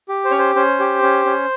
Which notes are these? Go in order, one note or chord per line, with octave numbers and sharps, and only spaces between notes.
G4
C5
C#4 C#5
C5
C#4 C5
G4
C#4
C#4